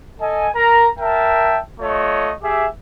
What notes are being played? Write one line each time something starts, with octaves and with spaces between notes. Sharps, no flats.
A4 D#5 G#5
A#4 A#5
A#4 E5 G5 A5
A3 F4 C#5 D#5
G4 G#4 E5